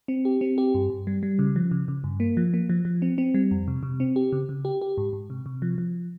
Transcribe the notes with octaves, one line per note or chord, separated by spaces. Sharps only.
C4
G4
C4
G4
G2
G2
G3
G3
C#3
F3
C#3
C#3
G2
A#3
F3
A#3
F3
F3
C4
C4
G3
F2
C3
C3
C4
G4
C#3
C#3
G4
G4
G#2
G#2
C3
C3
F3
F3